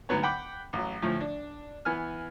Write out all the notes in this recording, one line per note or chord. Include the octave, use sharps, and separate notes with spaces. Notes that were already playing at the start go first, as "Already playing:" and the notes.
D2 G#2 F#3 B3 C#5
F#5 G5 B5 D6
A1 F#3
D2 A2 F3
D4
E3 B3 G#5 F6